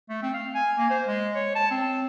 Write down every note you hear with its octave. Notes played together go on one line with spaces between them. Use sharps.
A3
C4
F5
G#5
A#3
C5
G#3
C#5
A5
C4